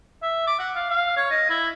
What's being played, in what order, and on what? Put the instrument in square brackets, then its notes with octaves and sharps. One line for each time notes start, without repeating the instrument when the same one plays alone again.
[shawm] E5
D6
F#5
F5
F5
C#5
D#5
E4